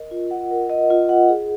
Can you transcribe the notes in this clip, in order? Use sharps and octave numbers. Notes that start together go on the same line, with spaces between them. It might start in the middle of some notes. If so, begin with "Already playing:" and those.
Already playing: A#4 D#5
F4
F#5
A#4
D#5
F4
F#5
G#4